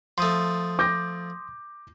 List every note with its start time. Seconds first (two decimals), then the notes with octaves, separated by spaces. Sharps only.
0.18 F3 A3 C6 D#6
0.79 D6 G6 A#6